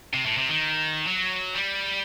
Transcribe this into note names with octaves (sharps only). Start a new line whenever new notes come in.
C3
A2
C3
D#3
F#3
G3